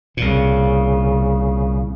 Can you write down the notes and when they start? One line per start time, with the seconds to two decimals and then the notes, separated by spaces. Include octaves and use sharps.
0.17 C2 A#2 C#3